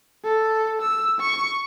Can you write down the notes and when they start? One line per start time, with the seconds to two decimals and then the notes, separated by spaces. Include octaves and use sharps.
0.25 A4
0.81 E6
1.21 C#6